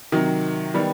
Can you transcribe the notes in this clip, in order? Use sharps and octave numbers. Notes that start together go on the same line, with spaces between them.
C3 D#3 F#3
D#3 G3 B3